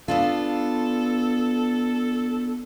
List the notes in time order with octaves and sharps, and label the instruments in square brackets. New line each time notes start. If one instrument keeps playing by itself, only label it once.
[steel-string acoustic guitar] B3 D4 F4 [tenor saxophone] A4